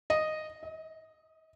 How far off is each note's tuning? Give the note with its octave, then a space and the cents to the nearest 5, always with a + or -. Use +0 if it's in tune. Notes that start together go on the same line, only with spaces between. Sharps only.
D#5 -5
D#5 +40